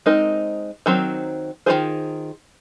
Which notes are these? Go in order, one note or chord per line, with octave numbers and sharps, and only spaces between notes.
G#3 C4 D#4 A#4
D#3 F#3 C4
D#3 A#3 F4 G#4 C5